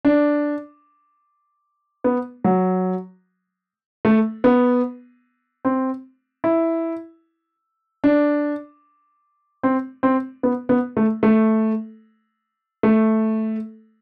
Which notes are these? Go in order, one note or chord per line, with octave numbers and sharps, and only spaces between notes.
D4
B3
F#3
A3
B3
C4
E4
D4
C4
C4
B3
B3
A3
A3
A3